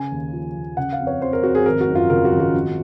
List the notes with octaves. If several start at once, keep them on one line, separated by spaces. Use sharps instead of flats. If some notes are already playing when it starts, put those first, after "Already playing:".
Already playing: C#3 G#5
D#2
F3
D#2
C#3 F#5
F5
F2
C#5
F2 C5
A#4
F2 F#4
G#4
G#1 A#4
F#4
F#2
F4
C#3 A#4
F#4
G#1
F#4
F3